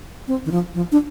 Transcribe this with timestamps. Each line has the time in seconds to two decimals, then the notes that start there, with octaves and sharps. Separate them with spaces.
0.28 C4
0.45 D#3
0.51 F3
0.74 F3
0.92 D4